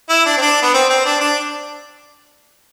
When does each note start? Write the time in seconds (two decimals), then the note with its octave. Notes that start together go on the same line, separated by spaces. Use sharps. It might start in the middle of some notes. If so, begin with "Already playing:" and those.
0.09 E4
0.26 D4
0.37 C4
0.41 D4
0.62 B3
0.74 C4
0.89 C4
1.06 D4
1.21 D4